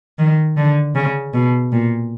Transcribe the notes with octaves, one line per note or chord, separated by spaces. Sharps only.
D#3
D3
C#3
B2
A#2